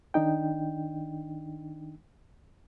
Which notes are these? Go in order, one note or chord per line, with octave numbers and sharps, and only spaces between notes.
D#3 D4 D#4 G5